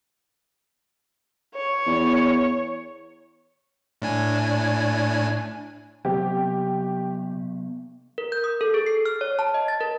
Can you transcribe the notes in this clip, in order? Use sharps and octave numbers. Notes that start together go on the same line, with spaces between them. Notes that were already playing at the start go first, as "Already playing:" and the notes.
C#5
E2
A2 D4 G#5
C3 F#3 A#3 B3 G4
A#4
G6
D#6
A4
G#4
C7
F6
C#5
A5
D#5
A6
A#4